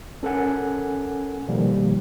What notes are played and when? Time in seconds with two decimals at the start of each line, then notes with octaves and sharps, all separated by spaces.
0.23 C#4 A4 A#4 F#5 G#5
1.48 B2 D#3 F3 G3 A#3